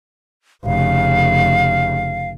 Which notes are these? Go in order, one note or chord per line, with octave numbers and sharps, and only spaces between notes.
F1 C#3 F5